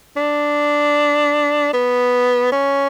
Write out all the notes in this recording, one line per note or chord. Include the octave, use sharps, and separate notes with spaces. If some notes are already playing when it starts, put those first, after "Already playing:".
D4
B3
C#4